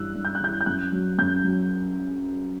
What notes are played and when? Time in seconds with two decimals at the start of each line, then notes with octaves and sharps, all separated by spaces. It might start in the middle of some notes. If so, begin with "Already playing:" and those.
Already playing: G2 E3 E6 F#6
0.15 G2
0.25 G6
0.35 F#6
0.41 E3 G6
0.61 G6
0.66 F#2 F#6
0.92 F#3
1.18 F#2 G6
1.44 F#3